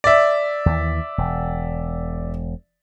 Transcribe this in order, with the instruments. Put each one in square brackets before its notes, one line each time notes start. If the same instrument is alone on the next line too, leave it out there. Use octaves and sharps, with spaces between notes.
[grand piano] D5 E5
[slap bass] D#2 E3
E1